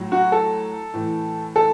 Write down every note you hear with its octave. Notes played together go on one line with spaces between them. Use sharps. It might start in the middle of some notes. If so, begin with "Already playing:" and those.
Already playing: A2 F#3
F#4
A4
A2 E3
A4